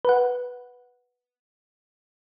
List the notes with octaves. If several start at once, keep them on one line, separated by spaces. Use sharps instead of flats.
B4 F#5